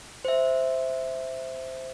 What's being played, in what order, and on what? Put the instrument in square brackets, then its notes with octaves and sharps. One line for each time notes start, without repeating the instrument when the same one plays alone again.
[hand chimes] C5 E5